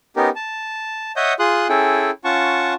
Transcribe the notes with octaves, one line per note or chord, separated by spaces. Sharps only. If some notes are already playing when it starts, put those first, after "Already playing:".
B3 C#4 D#4 G4 A#4
A5
C#5 D#5 E5 F#5 D#6 G6
F4 G#4 C6 D#6 F#6
C#4 E4 G#4 A4 G5
C#4 F4 F#5 A5 C#6